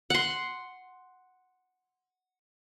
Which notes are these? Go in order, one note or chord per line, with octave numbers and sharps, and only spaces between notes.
F#5 C6